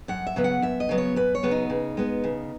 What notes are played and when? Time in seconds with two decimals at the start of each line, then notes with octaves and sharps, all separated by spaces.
0.08 F#2 F#5
0.27 E5
0.36 C#3 F#3 B3
0.44 F#5
0.62 F#2 E5
0.80 D#5
0.89 C#3 F#3 B3
0.98 C#5
1.16 F#2 B4
1.35 C#5
1.43 C#3 F#3 B3
1.51 D#4
1.70 C#3
1.97 G#3 B3
2.24 C#3